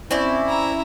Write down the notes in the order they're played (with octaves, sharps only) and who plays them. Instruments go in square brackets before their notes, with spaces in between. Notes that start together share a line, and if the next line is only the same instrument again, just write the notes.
[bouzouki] C4 C5 D5 [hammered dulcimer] C#4 [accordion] E4
[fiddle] E5 A#5